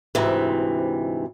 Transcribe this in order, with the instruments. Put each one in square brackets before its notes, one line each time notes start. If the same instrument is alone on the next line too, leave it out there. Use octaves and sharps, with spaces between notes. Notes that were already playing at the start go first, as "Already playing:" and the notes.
[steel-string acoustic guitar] D2 G#2 C3 E3